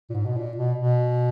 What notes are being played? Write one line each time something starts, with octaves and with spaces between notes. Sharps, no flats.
A#2
G#2
B2
A#2
B2
B2